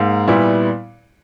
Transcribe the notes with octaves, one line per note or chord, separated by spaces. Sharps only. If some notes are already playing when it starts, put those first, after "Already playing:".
Already playing: G#2 A#3
A#2 G3 B3 E4